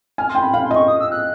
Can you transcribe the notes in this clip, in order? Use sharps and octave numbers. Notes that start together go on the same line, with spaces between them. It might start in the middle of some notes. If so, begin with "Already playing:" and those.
G#5 F6
C6
G5
B5
F5 B5
C6
D#5
C#6
D#6
E6
F#6